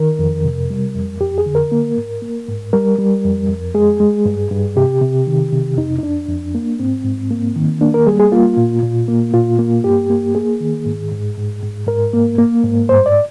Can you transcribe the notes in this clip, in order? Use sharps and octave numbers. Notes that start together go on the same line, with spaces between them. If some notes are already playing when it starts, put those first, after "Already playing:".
Already playing: D#3 A#4
F2
C3
G3
F2
F2 G4
G#4
D3
A#4
A#3
G#2
A#3
G#2
G3 A#4
G3
F2
F2
G#3 G#4
G#3
G2
G2
C3 G4
C3
D#3
C3
F2 D#4
D#4
F2 D4
F2
A#3
G#2 C4
G#2
A#3
D#3
A#3 D4
A#4
G3 G#4
G#4
A#3 F4
A#2
A#2
A#3
A#2 F4
A#3
G2 G4
A#3
A#3 G#4
D#3
G#2
G#2
G#2
G#2
G#2 A#4
A#3
A#3
G#2
G2 C5
D5